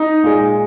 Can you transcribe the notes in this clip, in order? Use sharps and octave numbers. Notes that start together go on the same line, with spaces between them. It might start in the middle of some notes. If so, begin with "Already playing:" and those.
Already playing: D#4
A#2 G#3